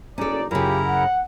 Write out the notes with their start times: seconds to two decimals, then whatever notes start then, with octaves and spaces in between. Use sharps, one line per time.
0.18 F#1 B1 C#4 D#4 A4 D5
0.51 F#2 C#3 E4 F4 G4 A#4 A#5
0.85 F#5